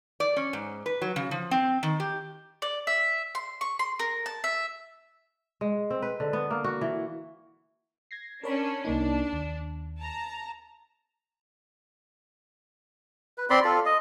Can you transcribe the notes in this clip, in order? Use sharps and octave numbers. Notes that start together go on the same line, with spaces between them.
D5
C#4
G#2
B4
F#3
C#3
F3
C4
D#3
G4
D5
E5
C6
C#6
C6
A#4
A5
E5
G#3
C4
B4
D3
B3
A#3
F#4
E3
G#6 A#6 C7
C#4 D4 A#4 C#5 B5
C2 A#3 D4 D#4
D#2
A5 A#5
B4
C4 D5 B5 C6
F4 A4
D#5